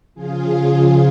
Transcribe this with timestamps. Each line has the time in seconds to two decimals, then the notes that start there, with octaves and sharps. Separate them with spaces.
0.14 C#3 F3 F4 G#4